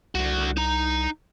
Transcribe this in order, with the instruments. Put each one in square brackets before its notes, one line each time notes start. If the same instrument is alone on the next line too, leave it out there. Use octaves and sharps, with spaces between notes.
[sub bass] C2 [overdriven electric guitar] D3 F#4
[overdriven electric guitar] D#4 A#5